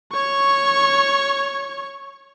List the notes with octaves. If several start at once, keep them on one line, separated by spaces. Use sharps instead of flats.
C#5 C#6